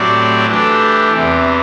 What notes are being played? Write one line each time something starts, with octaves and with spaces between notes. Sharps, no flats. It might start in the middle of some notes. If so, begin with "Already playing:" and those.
Already playing: A2 F#3 C4 G4 D5
E3 A3 D4 G4
E2 C3 E3